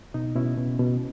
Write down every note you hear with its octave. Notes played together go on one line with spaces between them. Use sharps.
B2 D#4
B2 C#4 E4
B2
B2